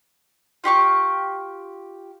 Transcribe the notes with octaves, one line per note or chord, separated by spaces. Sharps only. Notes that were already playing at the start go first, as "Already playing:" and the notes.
F4 G4 C#6 D6